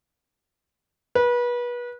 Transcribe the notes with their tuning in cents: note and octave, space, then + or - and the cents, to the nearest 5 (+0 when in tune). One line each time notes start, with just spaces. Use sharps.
B4 -30